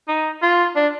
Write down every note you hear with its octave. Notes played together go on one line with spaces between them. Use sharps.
D#4
F4
D4